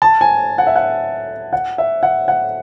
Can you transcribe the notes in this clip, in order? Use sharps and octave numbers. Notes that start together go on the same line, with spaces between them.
A5
G#5
F#5
E5
F#5
F#5
E5
F#5
F#5